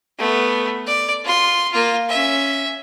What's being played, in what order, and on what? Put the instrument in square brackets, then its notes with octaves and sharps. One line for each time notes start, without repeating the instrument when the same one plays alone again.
[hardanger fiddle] A3 B3
D5
F4 C6
A#3 F4
C#4 E5